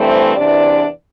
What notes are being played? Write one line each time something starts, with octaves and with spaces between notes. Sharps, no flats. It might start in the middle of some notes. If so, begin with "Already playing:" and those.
Already playing: G2 E3 A3 C4 C5
E2 C3 E3 D4 D5